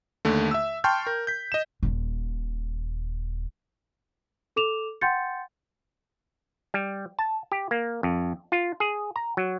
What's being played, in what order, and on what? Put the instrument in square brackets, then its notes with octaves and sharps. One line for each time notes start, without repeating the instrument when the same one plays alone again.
[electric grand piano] D#2 D3 A3
E5 E6
G5 A5 C6 C#6 F6 G6
A#4
G6 B6
D#5 E7
[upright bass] D#1 A#2
[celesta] A4 D6 E7 F7
F#5 G5 C6 G6 A6 C#7
[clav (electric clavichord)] G3
A5
G4
A#3
F2
F4
G#4
A#5
F#3